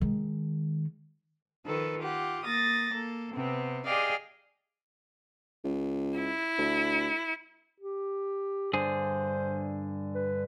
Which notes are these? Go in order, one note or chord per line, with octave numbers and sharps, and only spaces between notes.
D#3 G#3
D#3 F3 A4 B4
F4 G4 F#5
A#3 D#6 A6 A#6
A#3 A4
C3 B3 C4
G4 G#4 D5 D#5 F5 G5
C#2
E4
D2
G4
G2 D3 G#4 C5
B4